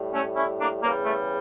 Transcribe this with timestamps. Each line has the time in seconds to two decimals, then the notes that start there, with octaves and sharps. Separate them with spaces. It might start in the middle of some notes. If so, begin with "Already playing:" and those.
Already playing: A2 G3
0.13 A3 C#4
0.36 C#4 E4
0.60 A#3 D4
0.83 E2 C#3 G3 A#3
1.05 A3